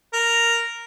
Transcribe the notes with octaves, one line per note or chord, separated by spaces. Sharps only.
A#4